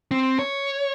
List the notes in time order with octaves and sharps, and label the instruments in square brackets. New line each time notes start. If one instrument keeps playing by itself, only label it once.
[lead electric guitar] C4
C#5